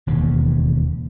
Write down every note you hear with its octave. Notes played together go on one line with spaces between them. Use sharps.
E1 D#2 C#3